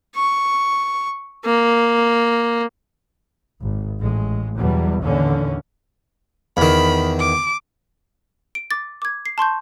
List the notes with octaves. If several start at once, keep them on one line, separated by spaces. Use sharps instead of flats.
C#6
A#3
G#1
A1 G#3
E2 B2 F#3 G3
D#2 A2 D3 E3 C#4
E2 D#3 B5
D6
D7
D6 A6
D6 G#6
C7
A5 C6 C#6 G6